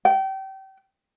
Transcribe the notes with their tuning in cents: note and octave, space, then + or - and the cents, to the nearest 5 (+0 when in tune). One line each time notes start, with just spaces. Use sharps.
G5 -30